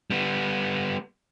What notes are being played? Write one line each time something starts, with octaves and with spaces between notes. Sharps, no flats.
G3 B3